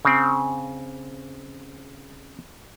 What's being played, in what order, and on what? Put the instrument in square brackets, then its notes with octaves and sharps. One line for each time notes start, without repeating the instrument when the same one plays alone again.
[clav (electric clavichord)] C#3 C4